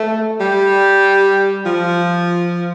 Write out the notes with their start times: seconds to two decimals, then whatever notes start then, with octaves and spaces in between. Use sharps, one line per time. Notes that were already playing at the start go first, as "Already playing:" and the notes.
Already playing: A3
0.40 G3
1.66 F3